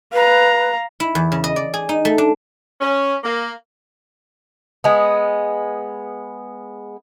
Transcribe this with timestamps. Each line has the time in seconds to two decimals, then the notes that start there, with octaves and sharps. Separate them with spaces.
0.13 B4 F5 A#5
1.00 E4
1.15 E2
1.32 C#3
1.44 D#5
1.56 D5
1.74 G#4
1.89 D#4
2.05 A3
2.18 D4
2.81 C#4
3.24 A#3
4.84 G#3 B3